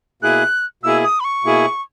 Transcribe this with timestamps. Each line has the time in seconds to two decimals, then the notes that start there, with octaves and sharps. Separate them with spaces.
0.22 B2 A#3 E4 G#4 F#6
0.83 B2 A#3 E4 G#4 E6
1.04 D#6
1.20 B5
1.24 C#6
1.44 B2 A#3 E4 G#4